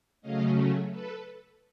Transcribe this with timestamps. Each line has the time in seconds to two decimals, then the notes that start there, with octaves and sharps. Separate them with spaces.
0.22 C#3 F#3 A3 C#4 D#5 F5
0.90 A4 B4